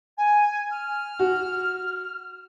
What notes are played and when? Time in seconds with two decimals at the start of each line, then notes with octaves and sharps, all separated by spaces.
0.17 G#5
0.70 F6
1.19 F#4